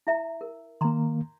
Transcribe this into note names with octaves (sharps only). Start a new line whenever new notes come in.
E4 E5 A#5
A#4
D#3 A#3 A#5 C6